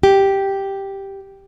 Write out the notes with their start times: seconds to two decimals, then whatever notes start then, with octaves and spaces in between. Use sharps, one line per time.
0.03 G4